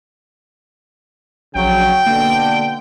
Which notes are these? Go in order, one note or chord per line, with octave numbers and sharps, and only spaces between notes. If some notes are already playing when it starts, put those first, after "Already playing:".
A#1 C#3 F#3 G5
B2 D3 A#3